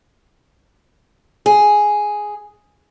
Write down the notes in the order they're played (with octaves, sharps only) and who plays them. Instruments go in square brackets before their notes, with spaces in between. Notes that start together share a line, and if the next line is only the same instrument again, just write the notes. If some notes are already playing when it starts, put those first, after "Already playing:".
[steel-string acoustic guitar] G#4